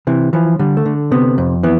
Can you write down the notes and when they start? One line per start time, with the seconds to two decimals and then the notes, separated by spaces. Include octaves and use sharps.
0.07 C3 E3
0.33 E3 F3
0.59 D3 G3
0.77 A3
0.85 D3
1.12 C3 B3
1.38 F2
1.63 E3 B3